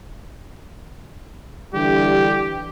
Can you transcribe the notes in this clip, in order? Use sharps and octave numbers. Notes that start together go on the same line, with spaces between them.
D3 E3 G3 G4